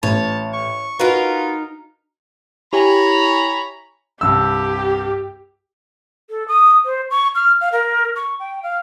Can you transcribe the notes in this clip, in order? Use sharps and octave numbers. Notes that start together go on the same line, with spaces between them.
A1 C#5 A5
C#6
D#4 F4 F#4 A#4 B4
E4 G4 C#5 G#5 A#5 B5
C2 G2 G4 E6
A4
D#6
C5
C#6
F6
F5
A#4
C#6
G5
F5